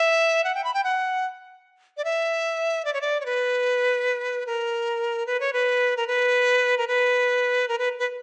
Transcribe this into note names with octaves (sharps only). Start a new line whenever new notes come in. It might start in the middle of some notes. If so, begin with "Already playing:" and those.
Already playing: E5
F#5
G5
B5
G5
F#5
D5
E5
D5
C#5
D5
C#5
B4
A#4
B4
C#5
B4
A#4
B4
A#4
B4
A#4
B4
B4